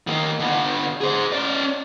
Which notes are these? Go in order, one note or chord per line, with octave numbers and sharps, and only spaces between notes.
D#3 A#3
D3 B3
G#4 C5
C#4 D5